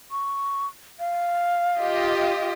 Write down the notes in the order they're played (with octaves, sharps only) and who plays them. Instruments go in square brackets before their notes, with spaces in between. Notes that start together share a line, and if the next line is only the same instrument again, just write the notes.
[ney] C#6
F5
[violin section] F4 G4 D#5